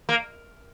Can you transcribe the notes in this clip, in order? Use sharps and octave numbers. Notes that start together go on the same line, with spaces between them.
A#3